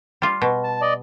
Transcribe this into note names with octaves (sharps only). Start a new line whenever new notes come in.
G3 F4
B2
A5
D5 D#5